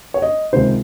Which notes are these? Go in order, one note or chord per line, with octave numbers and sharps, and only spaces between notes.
C#5
D#5
C#2 C3 D#3 C5